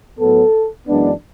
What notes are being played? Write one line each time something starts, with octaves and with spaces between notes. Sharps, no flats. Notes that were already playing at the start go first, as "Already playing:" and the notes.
A2 F#3 B3 A4
F#2 E3 G#3 B3 D4